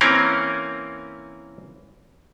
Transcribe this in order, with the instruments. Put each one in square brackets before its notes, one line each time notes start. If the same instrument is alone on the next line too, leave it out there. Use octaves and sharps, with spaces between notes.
[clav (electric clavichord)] E3 A#3 C4 C#4 A#4